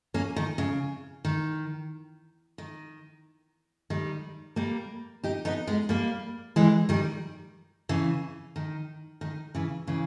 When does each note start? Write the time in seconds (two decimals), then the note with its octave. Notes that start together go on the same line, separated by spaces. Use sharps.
0.14 A#3 C#4
0.36 D#3
0.58 C#3
1.25 D#3
2.58 D#3
3.90 D#3 G3
4.56 G3 A#3
5.24 D#4 G4
5.45 B3 D#4
5.67 G#3 B3
5.89 G3 A#3
6.56 E3 G#3
6.89 D#3 G3
7.89 C#3 E3
8.56 D#3
9.21 D#3
9.55 C#3 E3
9.87 C#3 E3